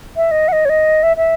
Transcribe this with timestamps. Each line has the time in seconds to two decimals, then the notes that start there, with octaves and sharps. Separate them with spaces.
0.16 E5
0.31 D#5
0.48 F#5
0.52 D#5
0.65 C#5
0.69 D#5
1.03 E5
1.17 E5